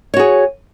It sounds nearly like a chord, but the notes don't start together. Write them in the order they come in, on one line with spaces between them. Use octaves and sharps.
C#5 F#4 G#4